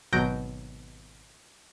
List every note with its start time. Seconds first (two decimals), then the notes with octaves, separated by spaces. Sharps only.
0.13 G#1 B2 F#3 G6 A#6 D7